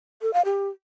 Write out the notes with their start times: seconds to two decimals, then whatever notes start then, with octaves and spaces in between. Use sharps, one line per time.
0.22 A4
0.33 F5
0.45 G4